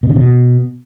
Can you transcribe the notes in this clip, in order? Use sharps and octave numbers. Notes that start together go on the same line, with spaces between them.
B2
D3
B2